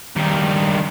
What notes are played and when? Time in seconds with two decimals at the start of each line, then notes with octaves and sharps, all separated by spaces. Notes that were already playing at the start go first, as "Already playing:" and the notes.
0.16 G2 D#3